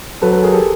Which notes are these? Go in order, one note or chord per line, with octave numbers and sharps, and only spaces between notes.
F#3 A4 B4
A4 B4
G#4 A#4
G4 A4